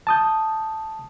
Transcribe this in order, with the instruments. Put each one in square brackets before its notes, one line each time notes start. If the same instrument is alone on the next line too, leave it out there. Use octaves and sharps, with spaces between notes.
[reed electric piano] A5 D#6 G6